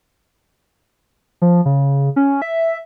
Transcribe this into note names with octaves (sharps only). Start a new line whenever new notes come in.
F3
C#3
C#4
E5